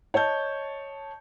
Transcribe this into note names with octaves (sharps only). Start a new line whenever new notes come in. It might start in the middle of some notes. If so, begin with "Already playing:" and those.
C#5 D#5 A5 G6